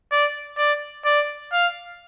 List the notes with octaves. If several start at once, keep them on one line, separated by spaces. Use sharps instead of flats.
D5
D5
D5
F5